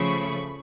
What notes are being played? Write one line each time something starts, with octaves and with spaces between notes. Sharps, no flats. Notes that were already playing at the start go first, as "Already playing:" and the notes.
Already playing: C#3 F3 A3 B5 C#6